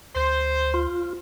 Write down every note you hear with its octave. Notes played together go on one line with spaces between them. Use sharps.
D2 C5
F4